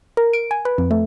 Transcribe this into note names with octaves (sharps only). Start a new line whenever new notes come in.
A#4
D7
G#5
B4
F2
A3